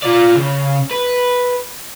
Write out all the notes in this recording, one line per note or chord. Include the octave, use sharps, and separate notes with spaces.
F4 D5
C#3
B4